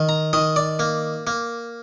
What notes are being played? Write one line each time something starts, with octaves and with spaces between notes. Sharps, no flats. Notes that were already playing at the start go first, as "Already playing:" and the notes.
Already playing: D#3
A#5
D#3 D#5
D5
A#3
A#3